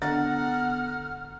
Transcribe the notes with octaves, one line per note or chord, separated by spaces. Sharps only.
D3 B3 F#5 A#5 F6 A6